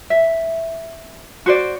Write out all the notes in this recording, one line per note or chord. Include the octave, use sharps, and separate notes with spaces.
E5
F#4 C5 D5